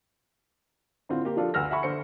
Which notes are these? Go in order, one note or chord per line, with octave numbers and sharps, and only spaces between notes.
A2 D3 C4 F4
A#3 G4
F3 D4 F4 A4
D2 B4 E6 F6 A#6
E5 F#5 G#5 B5 C#6
D3 C5 C#7